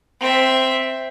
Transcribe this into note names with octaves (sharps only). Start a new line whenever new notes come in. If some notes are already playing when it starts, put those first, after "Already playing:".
C4 E5